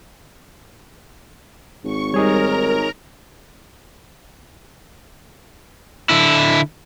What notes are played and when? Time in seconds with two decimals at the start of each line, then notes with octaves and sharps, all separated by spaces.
1.84 G#1 C#6
2.14 G3 D#4 G#4 A#4 C#5 A#5
6.09 D3 E4